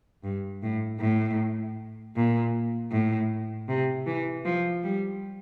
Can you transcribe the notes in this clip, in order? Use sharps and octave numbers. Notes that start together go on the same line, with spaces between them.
G2
A2
A2
A#2
A2
C3
E3
F3
G3